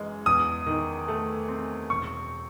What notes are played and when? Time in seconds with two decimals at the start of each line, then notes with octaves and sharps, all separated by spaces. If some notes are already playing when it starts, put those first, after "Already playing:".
Already playing: F#1 F#2 E3 G#3
0.26 E2 D#6
0.66 D#3
1.08 A3
1.48 C4
1.90 E1 C#6